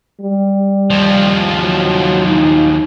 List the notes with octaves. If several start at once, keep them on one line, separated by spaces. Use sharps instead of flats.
G3
D#2 F3
F#3
D#4